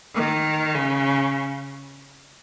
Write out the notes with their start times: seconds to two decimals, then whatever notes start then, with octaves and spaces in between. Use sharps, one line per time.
0.15 D#3
0.74 C#3